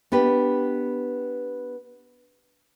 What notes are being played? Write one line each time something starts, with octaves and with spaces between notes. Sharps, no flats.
B3 D4 G4 B4